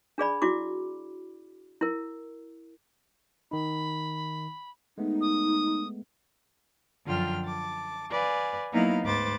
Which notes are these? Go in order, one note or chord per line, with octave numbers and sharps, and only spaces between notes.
D4 G#4 D5 B5
E4 F#4 D6
E4 A#4
D#3 D#4 B5
G#3 A3 B3 D#4
D#6
F#2 D3 F3 F4 G5 F6
A5 D6
B4 D5 F5 G#5
F#3 A#3 B3 D#4 E4 F5
D2 G#2 B4 C5 D6 A6